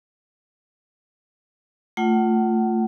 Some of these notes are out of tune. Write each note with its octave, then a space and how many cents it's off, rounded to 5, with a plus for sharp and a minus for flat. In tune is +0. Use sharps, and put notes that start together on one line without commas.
A3 +15 F4 +0 F#5 +35